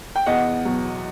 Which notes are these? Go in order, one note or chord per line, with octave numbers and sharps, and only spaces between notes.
G5
E2 D#5 F#5
B2 F#3